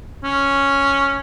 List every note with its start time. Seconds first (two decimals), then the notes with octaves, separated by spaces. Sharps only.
0.24 C#4